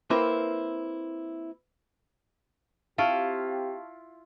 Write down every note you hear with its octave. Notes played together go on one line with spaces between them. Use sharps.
A#3 C4 E4 A#4 B4
C4 E4 F4 G4 F5 A5 C#6